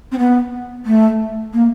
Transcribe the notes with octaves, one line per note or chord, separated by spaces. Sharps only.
C4
B3
A3
A#3